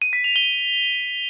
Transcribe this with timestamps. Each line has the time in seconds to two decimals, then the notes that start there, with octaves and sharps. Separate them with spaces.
0.02 D#7
0.13 B6
0.24 F7
0.36 G7